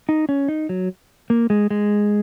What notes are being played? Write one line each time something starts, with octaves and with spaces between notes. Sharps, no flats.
D#4
C#4
D#4
F#3
A#3
G#3
G#3